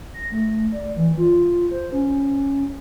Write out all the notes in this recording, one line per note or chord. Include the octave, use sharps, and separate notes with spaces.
A#6
A3
D5
E3
F4
C5
C#4